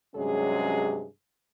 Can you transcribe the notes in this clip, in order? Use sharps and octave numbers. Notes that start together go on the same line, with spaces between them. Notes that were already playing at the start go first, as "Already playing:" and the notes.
G2 C3 F#3 G#3 C#4 G#4